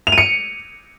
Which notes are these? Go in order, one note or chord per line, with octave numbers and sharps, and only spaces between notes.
F7
D#7
C#7